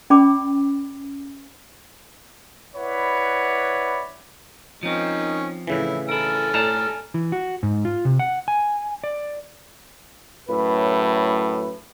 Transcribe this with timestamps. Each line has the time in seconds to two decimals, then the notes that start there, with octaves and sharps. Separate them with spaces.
0.10 C#4 D5 G5 B5 D6
2.76 E4 B4 C#5 D5 F#5 B5
4.83 D#3 F3 C4 C#4 D#4
5.67 A2 C#3 E3 E4
6.09 E4 A4 A#4 G#5 F6
6.54 A2 D5 A5 A#5
7.14 E3
7.32 F#4
7.63 G#2
7.85 F4
8.05 C3
8.19 F#5
8.48 G#5
9.04 D5
10.49 F#2 A2 B4